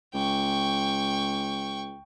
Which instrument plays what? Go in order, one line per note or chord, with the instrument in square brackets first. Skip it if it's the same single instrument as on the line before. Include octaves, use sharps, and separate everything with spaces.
[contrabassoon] C#2 [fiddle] G5 C#6